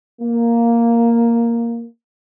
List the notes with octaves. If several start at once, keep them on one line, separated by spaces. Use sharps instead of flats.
A#3